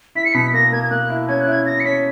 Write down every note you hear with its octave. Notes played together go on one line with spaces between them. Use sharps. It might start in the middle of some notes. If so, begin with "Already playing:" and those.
E4 B6
C#7
B2 B6
A#3 A#6
A#3 G#6
G#6
A#3 F#6
E4
C#4 G#6
F#6
E4 G#6
E4 A#6
C#7
C#4 B6